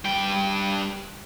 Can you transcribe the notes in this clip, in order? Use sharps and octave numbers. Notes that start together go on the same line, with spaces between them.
G2 G5